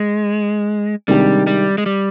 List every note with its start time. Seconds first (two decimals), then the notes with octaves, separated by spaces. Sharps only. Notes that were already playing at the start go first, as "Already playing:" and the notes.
Already playing: G#3
1.08 C3 D#3 G3 G#3 D4 G4
1.47 G3
1.78 G#3
1.86 G3